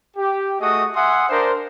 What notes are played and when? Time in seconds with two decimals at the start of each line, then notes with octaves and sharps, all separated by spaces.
0.16 G4
0.60 A3 F#4 G#4 D#5 D#6
0.95 E5 F#5 G#5 C6 D#6
1.29 D4 A#4 C5